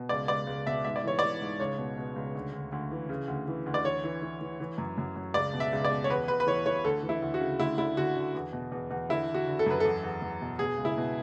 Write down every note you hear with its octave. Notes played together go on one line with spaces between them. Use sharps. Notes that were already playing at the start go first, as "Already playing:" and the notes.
Already playing: B2
C#2 D5
C#2 D5
C#2
B2 E5
G#2 E5
D5
E3 C#5
E3 D5
G#2
C#2 C#5
B2
B2
C#2
D2
D2
D2
E3
C#3
D2
E3
D2
D5
E3 C#5
E3
E3
E3
E3
F#2
F#2
F#2
C#2 D5
B2
E5
C#2
D5
B2
C#5
E2 B4
E2 B4
B4
E3 C#5
E3 C#5
D2 A4
E3
E4
D2
F#4
C#3
D2 E4
D3 E4
D3 F#4
D3
E2
B2
E2
E2
D3 E4
D3
F#4
D3
A4
F#2 B4
E2 A4
E2
E2
B2
B2 G#4
C#2
E4
B2